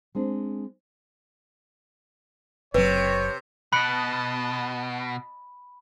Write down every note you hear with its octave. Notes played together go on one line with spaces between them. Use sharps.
G#3 C4 D4
F#1 C3 F#3 B4 C#5
B2 D#5 A5 B5 F#6 C#7 D7